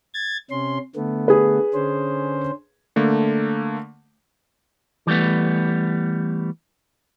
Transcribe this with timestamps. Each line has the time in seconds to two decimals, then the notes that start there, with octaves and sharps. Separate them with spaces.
0.14 G#6 A6
0.51 C3 C#4 C6
0.96 D3 A3 B3
1.28 G#4 B4
1.74 D3 C#4 C5
2.96 D3 A3 A#3
5.07 E3 G3 A3 B3